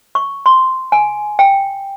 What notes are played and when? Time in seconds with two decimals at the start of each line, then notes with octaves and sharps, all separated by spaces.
0.15 C#6
0.46 C6
0.92 G#5
1.39 G5